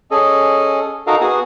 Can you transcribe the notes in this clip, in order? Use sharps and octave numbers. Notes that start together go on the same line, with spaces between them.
C#4 G#4 A4 D#5
D#4 F#4 A4 A#4 D#5 F5
B3 F#4 G#4